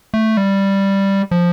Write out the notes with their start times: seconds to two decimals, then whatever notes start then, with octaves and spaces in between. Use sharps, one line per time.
0.14 A3
0.37 G3
1.31 F3